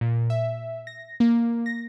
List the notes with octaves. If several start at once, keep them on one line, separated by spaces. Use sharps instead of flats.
A#2
E5
A#6
A#3
A#6